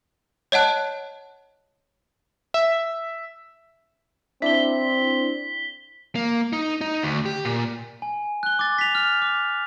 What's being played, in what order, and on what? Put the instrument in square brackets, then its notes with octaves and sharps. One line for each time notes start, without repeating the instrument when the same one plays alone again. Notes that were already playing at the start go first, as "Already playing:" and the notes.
[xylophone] C#5 D#5 F#5 A5 F#6
[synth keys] E5
[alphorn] C4 [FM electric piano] D4 E4 D5 [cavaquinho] E5 [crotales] B6 G7
[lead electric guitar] A#3
D#4
D#4
D2
G4
A#2
[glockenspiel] G#5
F#6 G7
D6 F#6 A6
B6 F7
F6
D6